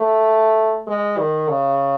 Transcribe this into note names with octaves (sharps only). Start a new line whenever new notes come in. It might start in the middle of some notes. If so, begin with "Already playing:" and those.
Already playing: A3
G#3
D#3
C#3